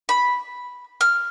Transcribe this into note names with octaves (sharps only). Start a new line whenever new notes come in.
B5
F6